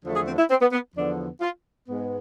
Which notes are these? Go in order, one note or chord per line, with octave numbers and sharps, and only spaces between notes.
E2 D3 F3 A3
G#4
C4
E4
C4
B3
B3
E2 D3 F3 B3 D4
F4
G#2 G#3 B3